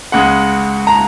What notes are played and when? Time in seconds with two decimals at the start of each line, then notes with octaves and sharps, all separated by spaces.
0.12 C#2 C#3 G#3 F#5
0.87 A#5